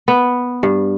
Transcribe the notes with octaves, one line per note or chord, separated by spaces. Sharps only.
B3
G2